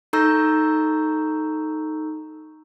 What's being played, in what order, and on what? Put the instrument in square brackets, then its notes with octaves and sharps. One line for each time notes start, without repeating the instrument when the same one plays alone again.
[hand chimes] D#4 A4 A#5 C#6 E6 G6